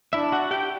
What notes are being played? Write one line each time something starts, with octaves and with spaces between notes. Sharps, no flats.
D4 E4 E5
F#4 F#5
G4 G5